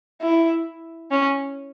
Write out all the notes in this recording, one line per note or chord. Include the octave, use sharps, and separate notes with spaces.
E4
C#4